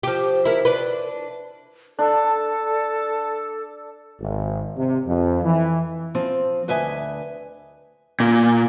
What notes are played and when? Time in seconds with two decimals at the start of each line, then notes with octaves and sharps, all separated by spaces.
0.03 F3 G4
0.45 E4 A#4
0.65 D4 B4
1.99 D4 A4
4.20 G#1
4.77 C3
5.06 F2
5.43 E3
6.15 F3 C4
6.68 D2 B4 D#5 E5 G#5
8.20 A#2